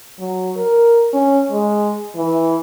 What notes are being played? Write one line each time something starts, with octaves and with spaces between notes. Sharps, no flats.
F#3
A#4
C#4
G#3
E3